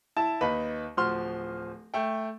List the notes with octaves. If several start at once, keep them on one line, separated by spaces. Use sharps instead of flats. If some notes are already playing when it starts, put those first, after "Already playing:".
E4 A5
D#2 D#4 B4 B5
D1 F3 F#4 C6 F6
A3 G5